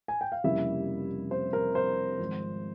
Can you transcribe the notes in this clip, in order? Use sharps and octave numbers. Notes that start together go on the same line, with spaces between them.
G#5
G5
F5
F1 F2 C#3 G3 A#3 E4 E5
C5
A#4
C5
G#1 G#2 F3